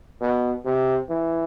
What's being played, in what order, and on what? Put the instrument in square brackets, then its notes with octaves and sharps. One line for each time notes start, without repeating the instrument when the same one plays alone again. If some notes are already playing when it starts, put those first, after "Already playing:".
[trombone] B2
C3
E3